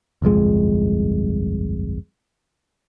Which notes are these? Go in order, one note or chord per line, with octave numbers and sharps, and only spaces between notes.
G1 C2 F2 G#3